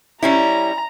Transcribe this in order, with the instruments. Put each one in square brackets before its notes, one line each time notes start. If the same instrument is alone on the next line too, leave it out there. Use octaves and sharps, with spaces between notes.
[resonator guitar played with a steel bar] G3 C#4 E4 [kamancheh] A#5